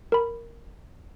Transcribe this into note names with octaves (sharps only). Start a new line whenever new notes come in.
A#4 B5